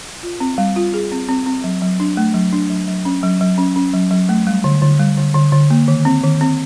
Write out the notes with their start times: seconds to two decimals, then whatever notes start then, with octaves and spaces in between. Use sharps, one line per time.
0.23 F4
0.40 C4
0.58 G3
0.76 F4
0.94 G#4
1.12 C4
1.29 C4
1.46 C4
1.64 F#3
1.82 F#3
2.00 D4
2.17 A3
2.34 F#3
2.53 D4
2.70 F#3
2.88 F#3
3.05 C#4
3.23 F#3
3.41 F#3
3.58 C#4
3.76 C#4
3.94 F#3
4.11 F#3
4.29 A3
4.47 G3
4.64 D3
4.82 D3
5.00 G3
5.17 D3
5.35 D3
5.52 D3
5.70 A#3
5.88 D#3
6.05 C4
6.23 D#3
6.41 C4